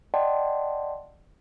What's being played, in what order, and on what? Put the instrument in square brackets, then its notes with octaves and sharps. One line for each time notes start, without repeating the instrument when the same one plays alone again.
[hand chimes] D5 D#5 F#5 G5 A5 C6